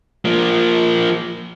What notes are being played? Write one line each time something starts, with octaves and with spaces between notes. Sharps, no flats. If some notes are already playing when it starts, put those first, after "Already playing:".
F3 A#3